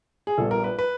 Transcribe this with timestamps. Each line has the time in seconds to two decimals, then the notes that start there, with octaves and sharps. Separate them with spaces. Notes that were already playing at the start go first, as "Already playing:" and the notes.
0.27 G#4
0.38 A#1 A#2 G3 B3 A4
0.51 A#4
0.64 B4
0.79 B4